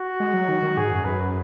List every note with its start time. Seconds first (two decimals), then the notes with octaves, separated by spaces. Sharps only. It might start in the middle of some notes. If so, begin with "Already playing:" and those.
Already playing: F#4
0.20 G#3
0.34 F#3
0.48 D#3
0.63 D#3
0.77 G#2 G#4
0.91 F#2
1.05 F#2 B4